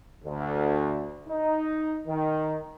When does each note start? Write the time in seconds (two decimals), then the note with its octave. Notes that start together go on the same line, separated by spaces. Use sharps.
0.24 D2
1.28 D#4
2.07 D#3